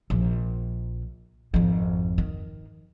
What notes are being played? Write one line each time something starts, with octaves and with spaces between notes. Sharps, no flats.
A#1
G#1 F2
D#3